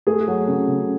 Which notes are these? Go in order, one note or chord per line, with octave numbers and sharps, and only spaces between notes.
A3 G#4
F#3
C#3
C#3